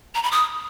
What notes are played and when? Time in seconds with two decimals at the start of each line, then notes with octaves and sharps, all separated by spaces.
0.15 A#5
0.23 B5
0.32 D#6